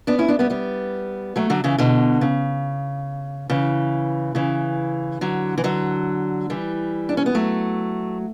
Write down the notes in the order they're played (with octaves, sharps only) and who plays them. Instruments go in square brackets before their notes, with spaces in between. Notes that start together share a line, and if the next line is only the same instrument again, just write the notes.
[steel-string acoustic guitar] B3 D4
C#4 E4
B3 D4
G3 B3
G3 B3
F#3 A3
D3 F#3
C#3 E3
B2 D3
C#3
C#3 E3
C#3 E3
D3 F#3
E3
D3 F#3
E3 G3
D4
C#4
B3
F#3 A3